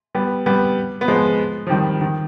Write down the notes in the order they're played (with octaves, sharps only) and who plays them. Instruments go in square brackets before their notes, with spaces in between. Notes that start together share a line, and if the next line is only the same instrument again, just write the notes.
[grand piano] G3 B3
G3 B3
B3
F3 G#3
F3
D#3 G3
D#3